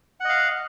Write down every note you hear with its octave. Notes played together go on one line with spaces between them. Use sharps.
D#5 F5 F#5